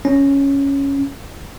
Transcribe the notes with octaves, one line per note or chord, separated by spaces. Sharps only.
C#4